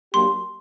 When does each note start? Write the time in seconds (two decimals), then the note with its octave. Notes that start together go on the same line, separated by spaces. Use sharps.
0.14 F#3 A#3 D4 G4 C6